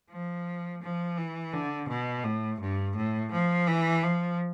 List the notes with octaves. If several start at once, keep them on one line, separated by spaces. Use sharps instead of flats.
F3
F3
E3
D3
B2
A2
G2
A2
F3
E3
F3